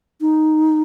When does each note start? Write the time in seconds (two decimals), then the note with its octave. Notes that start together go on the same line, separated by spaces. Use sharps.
0.21 D#4